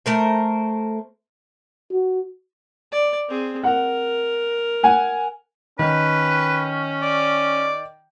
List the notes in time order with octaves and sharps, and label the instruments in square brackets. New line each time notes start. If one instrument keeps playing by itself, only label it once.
[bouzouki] A3 A#4 C5
[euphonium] F#4
[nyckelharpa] D5
C4 G#4
[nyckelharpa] A#4 [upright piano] F#5
[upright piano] F#5 G#5
[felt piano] D#3 [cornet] C#4 [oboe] B4
[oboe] D5